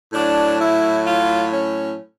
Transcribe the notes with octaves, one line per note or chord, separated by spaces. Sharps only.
A2 F#3 D4
E4
F4
C#4